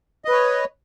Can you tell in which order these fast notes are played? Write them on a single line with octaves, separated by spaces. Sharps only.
D#5 B4 C#5